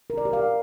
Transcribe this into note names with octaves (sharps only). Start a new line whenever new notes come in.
A#4
D5
G4
F5